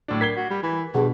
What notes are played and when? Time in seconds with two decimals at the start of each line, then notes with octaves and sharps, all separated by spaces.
0.08 A2 F#3 D4
0.21 A#4 G#6 B6 C7 G7
0.36 F#4
0.50 G3
0.63 E3
0.94 G2 B2 G#4